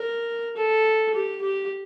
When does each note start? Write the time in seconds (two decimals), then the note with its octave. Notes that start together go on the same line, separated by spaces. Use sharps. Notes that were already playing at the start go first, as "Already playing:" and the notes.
Already playing: A#4
0.56 A4
1.14 G4
1.42 G4